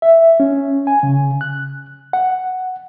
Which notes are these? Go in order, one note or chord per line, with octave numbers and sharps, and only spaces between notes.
E5
C#4
G#5
C#3
F#6
F#5